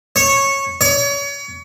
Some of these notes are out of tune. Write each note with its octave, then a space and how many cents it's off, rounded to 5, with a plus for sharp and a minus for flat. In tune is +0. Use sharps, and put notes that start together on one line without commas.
C#5 -10
C#5 +35